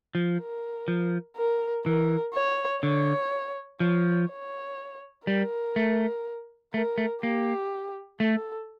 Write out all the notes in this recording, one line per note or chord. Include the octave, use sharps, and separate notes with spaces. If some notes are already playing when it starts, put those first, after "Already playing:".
F3
A#4
F3
A#4
E3 A#4
C#5
D3 C#5
F3 C#5
C#5
G3 A#4
A3
A3 A#4
A3
A#3 G4
A3 A4